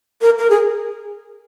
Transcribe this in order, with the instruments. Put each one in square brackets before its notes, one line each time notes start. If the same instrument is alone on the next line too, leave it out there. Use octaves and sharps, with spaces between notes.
[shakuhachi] A#4
A#4
G#4